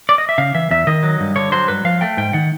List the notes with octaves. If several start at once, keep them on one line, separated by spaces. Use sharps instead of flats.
D5
D#5
E5
C#3 F5
E3 E5
E2 E5
D#3 D#5
F#3
G2
D3 C#5
F#3 C5
G2 B4
F3 F5
A3 G5
G#2 G5
D#3 F#5